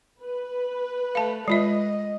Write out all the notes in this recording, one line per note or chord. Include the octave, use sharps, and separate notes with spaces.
B4
A3 F5 A5
G#3 F4 D#5 E5